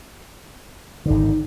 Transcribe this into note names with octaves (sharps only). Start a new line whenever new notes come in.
G#1 D3 D#4